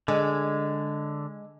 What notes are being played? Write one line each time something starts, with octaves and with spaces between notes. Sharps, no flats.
D3 G#3